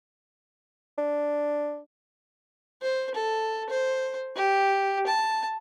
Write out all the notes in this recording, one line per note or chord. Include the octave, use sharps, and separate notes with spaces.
D4
C5
A4
C5
G4
A5